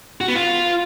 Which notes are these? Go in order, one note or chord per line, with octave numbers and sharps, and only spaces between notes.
F#4
B3
F4